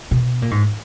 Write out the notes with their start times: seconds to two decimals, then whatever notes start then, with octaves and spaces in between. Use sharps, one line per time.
0.11 B2
0.42 A#2
0.51 G#2